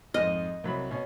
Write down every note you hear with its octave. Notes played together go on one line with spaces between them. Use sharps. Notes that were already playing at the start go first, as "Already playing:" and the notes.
F2 G#2 D#5 F6
C2 F#3 B5
B2 C#4